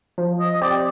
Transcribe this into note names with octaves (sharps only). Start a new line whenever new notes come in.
F3
D#5
C4 G4 D5